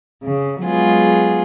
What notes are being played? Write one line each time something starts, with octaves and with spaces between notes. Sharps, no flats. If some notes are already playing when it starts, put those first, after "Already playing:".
C#3
F#3 G#3 B3 F4 G#4